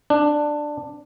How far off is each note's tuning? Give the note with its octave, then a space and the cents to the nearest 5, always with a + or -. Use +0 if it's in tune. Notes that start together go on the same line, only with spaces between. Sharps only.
D4 +10